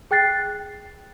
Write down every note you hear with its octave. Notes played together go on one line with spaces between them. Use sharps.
G#4 G5 F#6 A6 C7